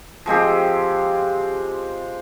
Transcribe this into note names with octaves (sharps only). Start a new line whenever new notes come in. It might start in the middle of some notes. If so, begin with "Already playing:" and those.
F3 G#3 C4 G4